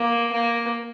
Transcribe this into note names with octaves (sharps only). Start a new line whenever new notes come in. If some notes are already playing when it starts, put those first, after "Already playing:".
Already playing: A#3
A#3